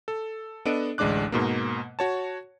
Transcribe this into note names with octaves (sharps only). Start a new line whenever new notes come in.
A4
B3 D4 A4 D#5 D7
A1 D2 G#3 D4 D6 F#6
G#2 B2 A#3
F#4 C#5 A5